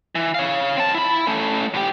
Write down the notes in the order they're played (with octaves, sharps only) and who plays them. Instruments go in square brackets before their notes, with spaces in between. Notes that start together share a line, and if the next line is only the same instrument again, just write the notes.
[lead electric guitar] E3
C#5 F5
C4 A5
E4 B5
A3 C#4
A2 G4